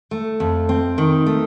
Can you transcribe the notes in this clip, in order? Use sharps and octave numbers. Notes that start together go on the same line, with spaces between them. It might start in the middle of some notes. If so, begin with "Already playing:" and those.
A3
F2
C4
D#3
A3